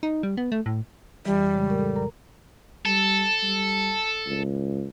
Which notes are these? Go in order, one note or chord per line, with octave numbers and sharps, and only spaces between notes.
D#4
G3
B3
A3
A2
F2 E3 G3
C#3 G#3
A2 A#4
A4
A#4 A#5
G3 A4
G3
C#2